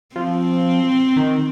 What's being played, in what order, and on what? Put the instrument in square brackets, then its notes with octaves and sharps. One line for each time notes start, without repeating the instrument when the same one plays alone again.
[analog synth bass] F3 [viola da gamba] C4
[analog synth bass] D#3